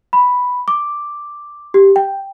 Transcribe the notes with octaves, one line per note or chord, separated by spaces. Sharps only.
B5
D6
G4
G5